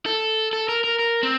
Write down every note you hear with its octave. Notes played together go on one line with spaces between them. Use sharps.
A4
A4
A#4
A#4
A#4
C4